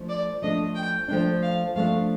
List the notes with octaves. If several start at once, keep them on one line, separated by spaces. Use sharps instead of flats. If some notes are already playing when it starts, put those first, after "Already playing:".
Already playing: F3 A3 D4
D5
F3 A3 D4 D#5
G5
F3 A3 D4 G5
F5
F3 A3 D4 F5